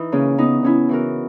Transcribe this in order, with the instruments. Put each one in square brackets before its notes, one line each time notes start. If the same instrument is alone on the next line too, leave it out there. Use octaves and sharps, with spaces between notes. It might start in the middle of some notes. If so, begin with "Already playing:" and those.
Already playing: [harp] E3 D#4
C#3 A#3 C#4
E3 B3 D#4
C#3 C#4 E4
E3 F#4 A#4